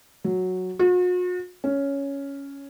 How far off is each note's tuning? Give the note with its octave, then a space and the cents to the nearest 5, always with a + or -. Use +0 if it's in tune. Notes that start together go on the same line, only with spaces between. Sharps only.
F#3 -5
F#4 -45
C#4 +5